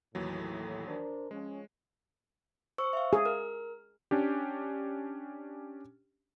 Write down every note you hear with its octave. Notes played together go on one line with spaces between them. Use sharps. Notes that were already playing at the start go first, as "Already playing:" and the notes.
D#2 A2 E3 F#3
D4 A#4 C5
F3 G#3 C#4
C5 C#6 E6
E5 F5
G#4
A#4 F6
C#4 D4 G4